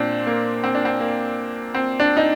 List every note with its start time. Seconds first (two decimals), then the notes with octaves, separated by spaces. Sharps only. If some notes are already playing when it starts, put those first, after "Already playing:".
Already playing: A#2 C4 D4
0.27 A#3
0.64 C4
0.75 D4
0.85 C4
1.01 A#3
1.75 C4
2.00 D4
2.17 D#4